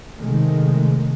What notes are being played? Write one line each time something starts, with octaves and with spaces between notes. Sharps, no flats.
C3 D#3 G#3 A3